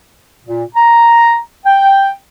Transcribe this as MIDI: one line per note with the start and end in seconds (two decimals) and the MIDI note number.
0.45 0.64 46
0.75 1.38 82
1.66 2.13 79